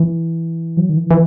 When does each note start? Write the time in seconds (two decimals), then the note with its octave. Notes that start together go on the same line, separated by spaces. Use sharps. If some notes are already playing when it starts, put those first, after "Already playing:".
Already playing: E3
0.77 F#3
0.90 D#3
0.97 E3
1.11 E3